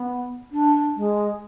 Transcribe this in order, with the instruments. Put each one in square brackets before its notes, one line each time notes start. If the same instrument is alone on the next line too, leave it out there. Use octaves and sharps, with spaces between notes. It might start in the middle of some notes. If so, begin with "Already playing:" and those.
Already playing: [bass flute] B3
D4
G#3